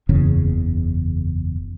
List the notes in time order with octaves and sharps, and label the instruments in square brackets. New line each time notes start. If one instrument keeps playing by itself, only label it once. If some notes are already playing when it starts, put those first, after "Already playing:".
[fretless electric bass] F#1 E2 C#3 C#4